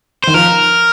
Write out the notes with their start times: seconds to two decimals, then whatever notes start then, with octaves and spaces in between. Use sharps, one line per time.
0.24 D#3 C5
0.34 F3 A#4